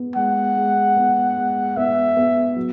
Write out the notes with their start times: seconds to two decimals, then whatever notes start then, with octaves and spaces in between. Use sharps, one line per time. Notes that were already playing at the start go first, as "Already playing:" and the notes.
Already playing: B3
0.16 G#3 F#5
0.57 G#3
0.97 B3
1.37 G#3
1.77 B3 E5
2.17 B3
2.56 F#3